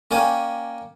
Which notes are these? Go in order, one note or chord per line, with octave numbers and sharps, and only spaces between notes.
A#3 C#4 D5 G5 G#5